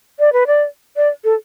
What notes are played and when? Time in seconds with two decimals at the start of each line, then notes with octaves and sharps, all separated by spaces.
0.19 D5
0.33 B4
0.47 D5
0.96 D5
1.24 A4